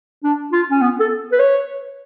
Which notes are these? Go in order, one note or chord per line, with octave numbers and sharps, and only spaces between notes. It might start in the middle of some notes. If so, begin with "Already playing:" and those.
D4
F4
C#4
B3
A4
B4
C#5